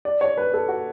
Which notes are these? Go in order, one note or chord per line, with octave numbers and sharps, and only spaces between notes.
D5
C#5
B4
A4
F#4